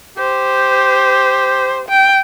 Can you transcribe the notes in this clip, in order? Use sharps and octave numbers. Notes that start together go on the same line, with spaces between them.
G4 C5
G5